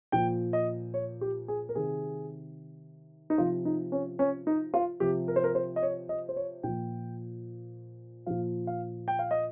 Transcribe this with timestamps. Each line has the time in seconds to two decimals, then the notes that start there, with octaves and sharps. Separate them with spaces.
0.12 A#2 F3 G5
0.53 D#5
0.94 C#5
1.21 G4
1.48 G#4
1.69 A#4
1.75 C3 D#3 G#4
3.30 D#4
3.37 C3 F3 F4
3.65 D#4
3.92 C#4
4.19 C#4
4.47 D#4
4.74 F4
5.00 C3 F3 G4
5.28 A#4
5.36 C5
5.44 A#4
5.55 C5
5.76 D#5
5.82 C#5
6.09 D#5
6.29 C5
6.36 C#5
6.63 A#2 F3 G5
8.26 A#2 F3 F5
8.67 F5
9.08 G5
9.19 F5
9.31 D#5